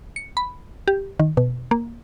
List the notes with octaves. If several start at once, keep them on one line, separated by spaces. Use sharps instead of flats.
C#7
B5
G4
D#3
B2
A#3